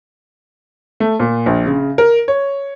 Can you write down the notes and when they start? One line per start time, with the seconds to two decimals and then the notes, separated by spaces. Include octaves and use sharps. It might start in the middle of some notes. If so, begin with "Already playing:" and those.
1.00 A3
1.20 A#2
1.46 A#1
1.66 C#3
1.98 A#4
2.28 C#5